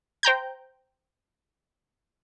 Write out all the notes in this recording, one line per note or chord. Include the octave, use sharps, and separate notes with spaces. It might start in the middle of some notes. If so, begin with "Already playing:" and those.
C5 G5 A#5 G6